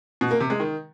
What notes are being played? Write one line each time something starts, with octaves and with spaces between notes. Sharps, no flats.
B2
A#3
C3
G#3
D#3